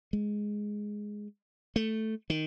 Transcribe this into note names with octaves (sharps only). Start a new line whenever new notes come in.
G#3
A3
D#3